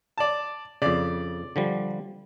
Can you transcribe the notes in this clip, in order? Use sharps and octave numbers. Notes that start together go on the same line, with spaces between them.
D5 A5
F2 C#3 D5
D3 F3 G3